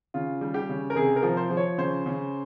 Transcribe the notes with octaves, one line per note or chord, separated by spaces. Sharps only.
C#3 F4
G3
G4
C#3
A#4
C3 G#4
A#4
F3
C5
F3
C#5
C#3 C5
C#3